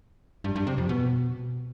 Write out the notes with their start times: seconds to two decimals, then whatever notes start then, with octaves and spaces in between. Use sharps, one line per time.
0.44 G2
0.56 G2
0.67 C3
0.78 F2
0.89 B2